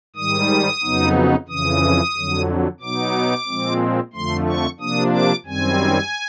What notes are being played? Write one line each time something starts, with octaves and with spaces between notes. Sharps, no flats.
G#2 D#3 G3 D#6
F2 C#3 F#3 B3 D#4
F2 C#3 E3 D#6
F2 D3 F#3
B2 F#3 B3 D#4 D6
A#2 F3 G#3 C4
F2 D3 F3 A3 C6
C#6
C3 F3 A#3 D4 D#6
D6
F#2 D#3 G3 C4 G#5